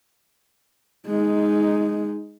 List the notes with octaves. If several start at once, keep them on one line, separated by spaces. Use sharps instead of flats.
G#3 D#4